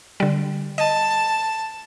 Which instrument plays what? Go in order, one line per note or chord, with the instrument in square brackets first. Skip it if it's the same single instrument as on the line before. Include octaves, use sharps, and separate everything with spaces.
[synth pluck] D3 G3
[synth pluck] D#5 [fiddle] A5